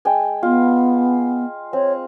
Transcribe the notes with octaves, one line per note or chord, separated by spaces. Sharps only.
G#3 G5 G#5
B3 F4
C4 C#5